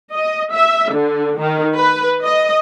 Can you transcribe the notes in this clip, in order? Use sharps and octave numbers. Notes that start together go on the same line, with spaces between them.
D#5
E5
D3
D#3
B4
D#5